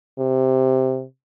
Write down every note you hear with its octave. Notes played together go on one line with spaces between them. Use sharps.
C3